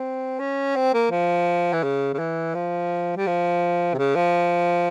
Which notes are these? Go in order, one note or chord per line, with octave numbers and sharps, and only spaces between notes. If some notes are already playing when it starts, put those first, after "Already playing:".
Already playing: C4
C#4
C4
A#3
F3
E3
C#3
C#3
E3
F3
G3
F3
C3
C#3
F3